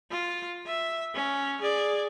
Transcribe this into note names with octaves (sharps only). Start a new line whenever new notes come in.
F4
E5
C#4
G#4 D5